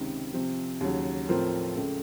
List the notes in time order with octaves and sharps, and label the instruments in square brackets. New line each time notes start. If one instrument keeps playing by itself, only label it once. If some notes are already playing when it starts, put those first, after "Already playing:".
Already playing: [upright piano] C#2 C3 D#3
C3 F3 C4
D#2 C#3 F#3
A2 F3 C4 F4 A#4
C#2 C#3 A3